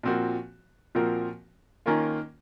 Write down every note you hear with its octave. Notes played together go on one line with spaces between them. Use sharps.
A#2 F3 C4 F#4 A#4
A#2 F3 C4 F#4 A#4
D#3 A#3 C#4 F4 A#4